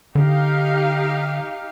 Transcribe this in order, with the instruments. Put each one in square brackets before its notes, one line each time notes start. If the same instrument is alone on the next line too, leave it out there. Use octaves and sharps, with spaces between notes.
[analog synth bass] D3 [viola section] D#4 G4 F5